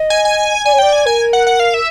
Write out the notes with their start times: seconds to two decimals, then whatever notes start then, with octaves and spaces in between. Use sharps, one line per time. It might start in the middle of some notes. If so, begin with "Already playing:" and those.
Already playing: D#5
0.10 G#5
0.25 G#5
0.65 D5 G#5
0.72 C#5
0.79 D5 G5
0.93 G#5
1.05 A#4 G#5
1.33 F#5
1.47 F#5
1.60 F5
1.74 E5